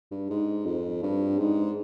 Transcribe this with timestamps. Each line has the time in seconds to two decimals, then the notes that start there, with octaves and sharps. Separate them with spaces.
0.11 G2
0.30 G#2
0.66 F2
1.03 G2
1.38 G#2